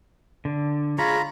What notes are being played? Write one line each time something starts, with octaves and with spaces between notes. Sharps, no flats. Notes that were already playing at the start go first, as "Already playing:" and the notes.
D3
G#3 F4 G#4 C#5 A#5 B5